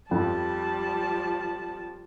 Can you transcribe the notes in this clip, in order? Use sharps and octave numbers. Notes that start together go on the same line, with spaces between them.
F2 F3 G3 A5